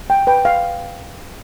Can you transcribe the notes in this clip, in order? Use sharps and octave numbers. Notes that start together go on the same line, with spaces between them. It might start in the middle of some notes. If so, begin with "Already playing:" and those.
G5
B4 G5
F5